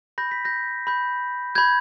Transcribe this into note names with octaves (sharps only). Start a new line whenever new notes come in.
B5 G6 A#6
B6
G6 A#6
B5 G6
B5 G6 G#6